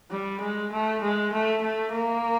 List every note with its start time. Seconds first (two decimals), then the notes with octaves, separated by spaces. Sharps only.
0.11 G3
0.41 G#3
0.72 A3
1.01 G#3
1.32 A3
1.62 A3
1.92 A#3